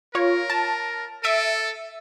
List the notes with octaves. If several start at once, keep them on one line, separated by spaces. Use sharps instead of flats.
F4 A#4 C#5
A5
A4 E5 D7 D#7